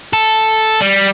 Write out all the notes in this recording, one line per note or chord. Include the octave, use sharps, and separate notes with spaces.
A4
G3